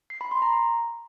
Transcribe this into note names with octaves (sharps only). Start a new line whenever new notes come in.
C7
B5
C6
A#5